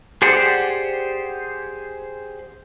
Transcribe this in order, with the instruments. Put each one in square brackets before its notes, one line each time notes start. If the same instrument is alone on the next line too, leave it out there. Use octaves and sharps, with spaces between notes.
[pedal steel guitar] G4 G#4 C5 D5 F#5